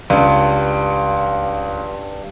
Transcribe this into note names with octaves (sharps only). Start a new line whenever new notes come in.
C#2 G2